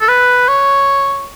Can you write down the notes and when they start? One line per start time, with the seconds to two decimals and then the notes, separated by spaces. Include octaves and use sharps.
0.01 A4
0.08 B4
0.48 C#5